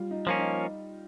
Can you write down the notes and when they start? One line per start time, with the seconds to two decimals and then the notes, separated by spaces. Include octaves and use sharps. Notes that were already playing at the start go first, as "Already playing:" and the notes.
Already playing: G3 F4
0.11 D#4
0.27 F3 A#3 C#4 D#4
0.39 D#4